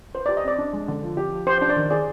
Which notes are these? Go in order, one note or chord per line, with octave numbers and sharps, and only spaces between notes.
B4 C5
D5
G4
D#5
C4 D5
D4
G#3
D3
F3
G4
F3
G4 C5
C5
D4
D5
D#3
G#4 D5